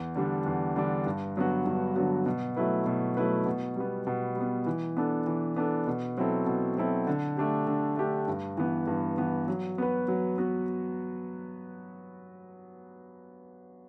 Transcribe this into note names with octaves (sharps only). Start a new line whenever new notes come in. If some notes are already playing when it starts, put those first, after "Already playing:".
Already playing: E2
D3 G3 D4
E2
D3 G3 D4
G2
D3 F#3 B3 F#4
G2
D3 F#3 B3 F#4
B2
F#3 A3 E4 B4
B2
F#3 A3 E4 B4
B2
G3 B3
B2
G3 B3
E3
B3 D4 A4
E3
B3 D4 A4
B2
F#3 C4 E4 A4
B2
F#3 C4 E4 A4
D3
A3 D4 G4
D3
A3 D4 G4
G2
E3 B3
G2
E3 B3
F#3
B3 F#4 B4
F#3
B3 F#4